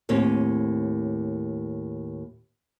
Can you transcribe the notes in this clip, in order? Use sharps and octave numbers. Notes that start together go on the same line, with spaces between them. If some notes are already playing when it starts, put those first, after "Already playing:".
D#2 A2 C4 C#4